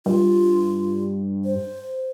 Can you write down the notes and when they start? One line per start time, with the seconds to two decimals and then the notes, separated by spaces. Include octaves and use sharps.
0.06 G2 F4
1.45 C5